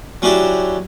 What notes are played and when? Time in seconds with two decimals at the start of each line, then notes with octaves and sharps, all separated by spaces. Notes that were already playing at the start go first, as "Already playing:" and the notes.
0.22 F#3 C#4 D4 E4 G4